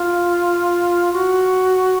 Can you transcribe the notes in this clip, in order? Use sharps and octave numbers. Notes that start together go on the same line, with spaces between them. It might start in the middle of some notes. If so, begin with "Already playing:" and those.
Already playing: F4
F#4